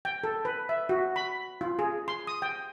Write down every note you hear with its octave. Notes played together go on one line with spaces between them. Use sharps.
G5
A4
B4
E5
F#4
B5
F4
G#4
C6
D#6
G5